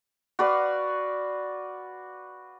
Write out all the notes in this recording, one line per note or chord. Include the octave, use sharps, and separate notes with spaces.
F#4 B4 D5 F5